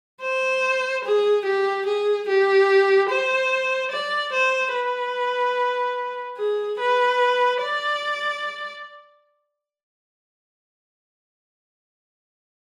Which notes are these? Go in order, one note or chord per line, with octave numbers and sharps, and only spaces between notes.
C5
G#4
G4
G#4
G4
C5
D5
C5
B4
G#4
B4
D5